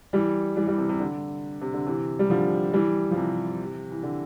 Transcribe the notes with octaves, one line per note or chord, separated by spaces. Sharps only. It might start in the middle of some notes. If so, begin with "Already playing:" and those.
E3 G3
E3 G3
E3 G3
C3 E3
C3
D3
C3
D3
C3 E3
G3
D3 F3
E3 G3
F3
C3 E3
E3
D3